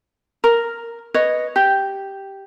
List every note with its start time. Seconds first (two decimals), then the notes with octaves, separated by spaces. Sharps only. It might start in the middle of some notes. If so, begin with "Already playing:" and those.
0.44 A#4
1.14 B4 C#5 D#5
1.56 G4